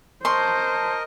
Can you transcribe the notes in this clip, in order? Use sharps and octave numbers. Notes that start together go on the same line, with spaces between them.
A#4 C5 D#5 A5 C6 C#6